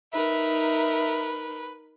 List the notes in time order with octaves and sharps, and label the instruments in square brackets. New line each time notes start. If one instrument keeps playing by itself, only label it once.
[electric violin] D#4 A#4 [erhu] B4 [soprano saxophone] E5